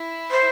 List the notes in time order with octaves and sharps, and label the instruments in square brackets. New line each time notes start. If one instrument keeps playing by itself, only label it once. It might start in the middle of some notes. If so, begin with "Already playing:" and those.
Already playing: [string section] E4
[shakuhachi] C5